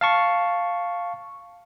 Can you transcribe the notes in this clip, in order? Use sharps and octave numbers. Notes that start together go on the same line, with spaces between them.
F5 A5 C#6